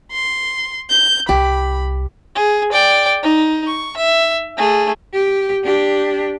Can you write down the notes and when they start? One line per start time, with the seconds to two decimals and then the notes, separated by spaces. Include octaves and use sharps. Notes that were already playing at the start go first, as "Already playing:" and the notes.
0.12 C6
0.90 G6
1.29 C2 G4 B5
2.35 G#4
2.72 D5 G5
3.23 D#4
3.67 C#6
3.97 E5
4.57 A3 G#4
5.13 G4
5.64 D4 G4